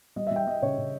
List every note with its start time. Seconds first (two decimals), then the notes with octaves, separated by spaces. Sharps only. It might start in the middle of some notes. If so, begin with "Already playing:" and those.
0.16 G3 D#5
0.27 G3 E5
0.36 G5
0.47 G3 D#5
0.62 C#3 C#5
0.78 C#3